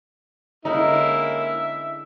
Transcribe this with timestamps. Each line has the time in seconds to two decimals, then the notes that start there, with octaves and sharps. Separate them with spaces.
0.65 D3 G#3 A#3 C#4 D#4 E4 E5